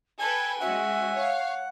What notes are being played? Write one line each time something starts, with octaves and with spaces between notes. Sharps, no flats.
A4 B4 G5 G#5 G#6
G#3 C#4 F#4 E5 F#5
C#5 F5